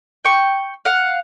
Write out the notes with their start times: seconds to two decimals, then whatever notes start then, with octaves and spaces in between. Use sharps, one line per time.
0.25 G5 C#6
0.85 F5 F#5